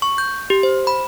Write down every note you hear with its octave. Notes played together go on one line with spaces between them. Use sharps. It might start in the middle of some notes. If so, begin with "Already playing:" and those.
C#6
G6
G4
C5
B5